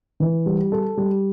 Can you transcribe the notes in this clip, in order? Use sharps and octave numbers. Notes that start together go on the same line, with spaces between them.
E3
G3
A4
G3